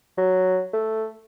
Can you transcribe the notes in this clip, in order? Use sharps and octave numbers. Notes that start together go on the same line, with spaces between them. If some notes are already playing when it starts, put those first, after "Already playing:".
F#3
A3